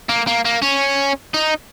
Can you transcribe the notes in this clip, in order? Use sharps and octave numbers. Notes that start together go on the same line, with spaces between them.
A#3
A#3
A#3
C#4
D#4